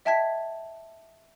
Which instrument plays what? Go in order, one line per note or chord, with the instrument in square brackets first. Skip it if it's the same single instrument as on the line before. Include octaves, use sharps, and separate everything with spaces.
[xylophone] D#5 E5 G5 A5 G#6 B6